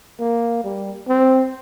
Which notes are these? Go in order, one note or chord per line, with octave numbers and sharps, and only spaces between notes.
A#3
G3
C4